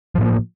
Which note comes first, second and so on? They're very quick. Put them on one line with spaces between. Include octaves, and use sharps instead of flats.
F3 A2 A#3